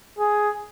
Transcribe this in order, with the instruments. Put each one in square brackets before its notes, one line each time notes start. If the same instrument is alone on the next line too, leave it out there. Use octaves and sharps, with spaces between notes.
[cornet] G#4